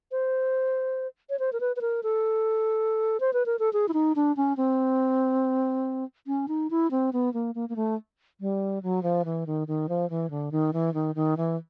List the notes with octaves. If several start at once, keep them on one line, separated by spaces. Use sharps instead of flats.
C5
C#5
C5
A#4
B4
B4
A#4
A4
C5
B4
A#4
A4
G#4
E4
D#4
D4
C#4
C4
C#4
D#4
E4
C4
B3
A#3
A#3
A#3
A3
G3
F#3
F3
E3
D#3
D#3
F3
E3
D3
D#3
E3
D#3
D#3
E3